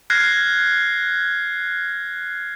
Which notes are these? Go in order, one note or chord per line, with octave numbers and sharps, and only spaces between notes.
F6 F#6 G#6 A#6 C7